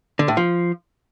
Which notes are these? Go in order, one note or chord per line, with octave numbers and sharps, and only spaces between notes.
D3
A2
F3